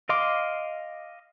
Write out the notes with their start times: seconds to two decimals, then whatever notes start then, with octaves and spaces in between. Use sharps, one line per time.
0.09 D#5 F5 C6 D6